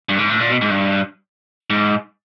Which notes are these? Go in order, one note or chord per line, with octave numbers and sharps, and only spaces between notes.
G2
G#2
A2
A#2
B2
G#2
G2
G#2